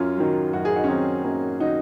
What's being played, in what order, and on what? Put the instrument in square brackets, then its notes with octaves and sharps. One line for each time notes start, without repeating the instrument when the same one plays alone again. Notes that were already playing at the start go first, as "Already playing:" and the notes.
Already playing: [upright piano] F#2 C#4 F4
D#3 F#3
F#2 F#4
G#4
D#4 F#4
C#4
D#3 F#3 C4 D#4
F#2 A#3 C#4
D#3 F#3 D#4 F#4